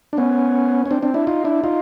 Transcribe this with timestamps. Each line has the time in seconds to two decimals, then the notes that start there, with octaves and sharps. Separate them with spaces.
0.13 D4
0.17 B3 C#4
0.86 C#4
0.91 C4 D4
1.02 C4 D4
1.14 D4 E4
1.27 D#4 F4
1.44 D4 E4
1.64 D#4 F4